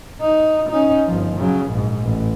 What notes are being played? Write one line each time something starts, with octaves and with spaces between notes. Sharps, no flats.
D#4
C#4 D#4
G1 F3
C#3 F#3
A#1 G#2
A1